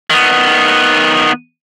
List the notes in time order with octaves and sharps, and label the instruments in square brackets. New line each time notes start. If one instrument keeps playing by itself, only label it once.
[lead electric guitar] D#3 B3